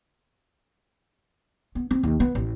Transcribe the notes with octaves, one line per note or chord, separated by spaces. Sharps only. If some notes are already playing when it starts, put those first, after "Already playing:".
B3
C4
D#2
B3
A1